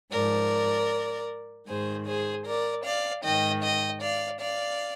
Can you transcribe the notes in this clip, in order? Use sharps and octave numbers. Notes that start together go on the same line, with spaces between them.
G#2 F3 A#4 D5
G#2 D#3 G#4 C5
G#4 C5
A#4 D5
D5 F5
G#2 D#3 D#5 G5
D#5 G5
D5 F5
D5 F5